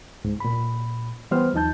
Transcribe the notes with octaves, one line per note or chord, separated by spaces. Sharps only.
C#2 G#2
A#2 B5
E3 G3 B3 C5 F6
D#2 F3 D#4 A5 G6